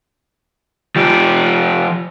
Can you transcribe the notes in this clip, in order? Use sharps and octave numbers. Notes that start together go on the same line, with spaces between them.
F3 G4